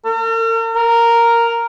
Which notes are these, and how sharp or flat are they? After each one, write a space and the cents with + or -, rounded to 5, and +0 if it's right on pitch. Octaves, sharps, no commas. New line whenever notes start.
A#4 -45
A#4 -5